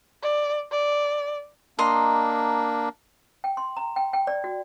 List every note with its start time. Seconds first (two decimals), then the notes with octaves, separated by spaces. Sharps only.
0.23 D5
0.71 D5
1.79 A#3 D4 D#5 A#5 C6
3.44 G5
3.57 C6
3.77 A#5
3.96 G5
4.13 G5
4.27 D5
4.44 F#4